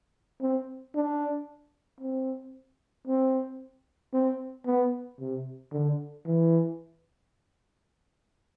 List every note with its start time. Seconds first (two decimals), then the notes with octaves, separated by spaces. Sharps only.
0.41 C4
0.95 D4
2.00 C4
3.07 C4
4.13 C4
4.66 B3
5.20 C3
5.72 D3
6.26 E3